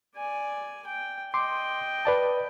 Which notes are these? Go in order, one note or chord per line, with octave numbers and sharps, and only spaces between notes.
D5 G#5
G5
D#5 G5 C6 D6
B4 D5 A5